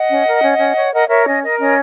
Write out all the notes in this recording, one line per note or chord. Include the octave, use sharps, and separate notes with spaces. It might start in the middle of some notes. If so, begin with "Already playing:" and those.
Already playing: D#5 F#5
C#4
A#4
C#4
C#4
C#5
A#4 D#5 F#5
A#4 C#5 E5
C#4 D#5
A#4 D#5
C#4 D#5